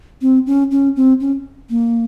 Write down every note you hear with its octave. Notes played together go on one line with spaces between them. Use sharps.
C4
C#4
C#4
C4
C#4
A#3